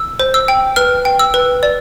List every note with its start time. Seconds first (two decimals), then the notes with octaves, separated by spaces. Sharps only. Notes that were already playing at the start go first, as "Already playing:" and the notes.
Already playing: E6
0.20 C5
0.34 E6
0.48 G5
0.76 B4 F6
1.05 G5
1.19 E6
1.34 B4
1.63 D5